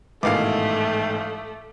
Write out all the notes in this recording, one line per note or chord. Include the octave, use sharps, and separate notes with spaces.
A1 G#2 B2 D#3 E3 A3 F5 D6